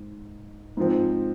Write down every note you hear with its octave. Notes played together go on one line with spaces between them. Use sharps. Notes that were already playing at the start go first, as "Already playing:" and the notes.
Already playing: G#2
G#2 F3 C4